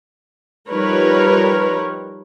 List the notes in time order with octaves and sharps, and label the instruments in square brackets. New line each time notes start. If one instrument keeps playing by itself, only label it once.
[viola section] F3 G3 D#4 A#4 B4 C#5